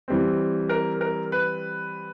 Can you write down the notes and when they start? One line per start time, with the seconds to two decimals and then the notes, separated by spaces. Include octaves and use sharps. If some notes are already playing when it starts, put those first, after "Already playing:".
0.08 E3 G3 C4
0.69 A#4
1.01 A#4
1.32 B4